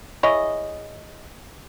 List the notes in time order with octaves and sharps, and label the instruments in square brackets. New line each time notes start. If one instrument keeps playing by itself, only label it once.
[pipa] E4 G#4 C#5 D#5